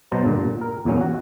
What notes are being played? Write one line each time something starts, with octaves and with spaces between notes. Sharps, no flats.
B2 F#3 C5 A5 A#5
G2 A#2 D3
A#2
A#4
E2 A#2 F#3 C#4
F#4